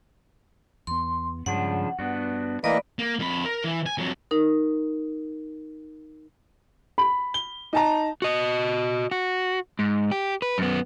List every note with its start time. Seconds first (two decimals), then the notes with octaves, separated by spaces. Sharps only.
0.87 E2 B3 C6
1.46 G2 C#3 F3 G#3 D4 F#5
1.99 G2 B3 D4 F#4
2.64 E3 A3 A#3 B4 D5 D#5
2.99 A#3
3.19 F2 B5
3.45 A#4
3.64 E3
3.86 G#5
3.98 F2 F#3
4.31 D#4 A#4
6.98 B5
7.34 G7
7.73 D#4 A5 A#5
8.22 F#4 D#5
9.11 F#4
9.79 G#2
10.12 G4
10.42 B4
10.58 F#2 B3